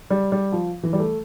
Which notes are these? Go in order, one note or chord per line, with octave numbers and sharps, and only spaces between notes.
G3
G3
F3
E3
G3
A3